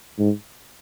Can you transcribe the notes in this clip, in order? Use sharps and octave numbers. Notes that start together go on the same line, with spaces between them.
G#2